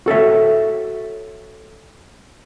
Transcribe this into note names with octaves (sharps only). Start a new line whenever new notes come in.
F#4 A4 C#5 E5